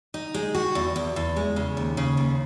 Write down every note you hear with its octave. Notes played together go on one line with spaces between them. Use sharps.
D#4
G#3
F#4
E2
E2
E2
G#3
C#3
D#2
C#3
D#2